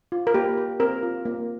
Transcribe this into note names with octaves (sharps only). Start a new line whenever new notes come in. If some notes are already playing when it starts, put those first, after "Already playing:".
F4
A#4
A#3 G4
G4
C4 A#4
F4
A#3